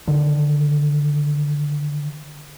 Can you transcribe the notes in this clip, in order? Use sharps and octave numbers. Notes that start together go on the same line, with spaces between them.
D3 D#3